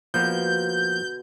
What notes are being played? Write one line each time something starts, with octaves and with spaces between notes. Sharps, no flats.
B2 D3 F3 A#3 B3 G6